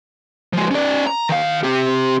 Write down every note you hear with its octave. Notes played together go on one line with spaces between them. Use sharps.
F3 G#3
C#4 D5
A#5
D#3 F5
C4 G4